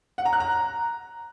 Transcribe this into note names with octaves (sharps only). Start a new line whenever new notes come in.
F#5
A#5
F#6
A#5